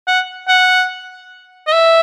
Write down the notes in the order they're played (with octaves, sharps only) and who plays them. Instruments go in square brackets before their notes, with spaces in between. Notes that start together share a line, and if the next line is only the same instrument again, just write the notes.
[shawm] F#5
F#5
D#5
E5